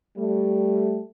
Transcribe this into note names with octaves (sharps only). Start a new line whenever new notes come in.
G3 A3